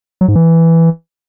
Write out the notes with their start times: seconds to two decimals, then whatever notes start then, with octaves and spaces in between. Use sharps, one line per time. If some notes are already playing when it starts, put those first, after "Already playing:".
0.21 F#3
0.28 G#2
0.35 E3